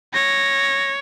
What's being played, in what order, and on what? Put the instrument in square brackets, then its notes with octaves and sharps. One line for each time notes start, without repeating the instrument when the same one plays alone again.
[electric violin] C#5 [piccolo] A#6